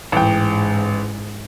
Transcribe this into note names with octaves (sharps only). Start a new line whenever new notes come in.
A1 G#2 G5